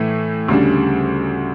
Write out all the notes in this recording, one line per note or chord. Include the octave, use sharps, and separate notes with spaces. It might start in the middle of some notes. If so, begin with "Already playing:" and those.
Already playing: A2 E3 A3
D2 C#3 G3 D4